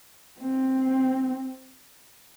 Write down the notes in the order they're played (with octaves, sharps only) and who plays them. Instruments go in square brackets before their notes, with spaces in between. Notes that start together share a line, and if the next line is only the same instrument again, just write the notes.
[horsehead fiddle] C4